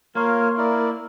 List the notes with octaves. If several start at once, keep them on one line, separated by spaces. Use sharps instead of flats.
A#3 F4 A#4 C#5 F5
E4 A#4 D5